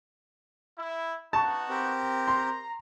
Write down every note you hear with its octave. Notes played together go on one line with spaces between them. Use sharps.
E4
B3 D#4 F#4 A5 C#6
C4 G4 A#4
A#5 C6